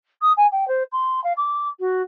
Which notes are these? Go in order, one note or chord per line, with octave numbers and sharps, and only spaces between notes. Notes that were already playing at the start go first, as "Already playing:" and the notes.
D#6
G#5
G5
C5
C6
F5
D6
F#4